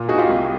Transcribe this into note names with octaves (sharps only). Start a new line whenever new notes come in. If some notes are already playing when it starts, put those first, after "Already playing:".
Already playing: A#2
D#4 F#4 G#4
F4 G4
C2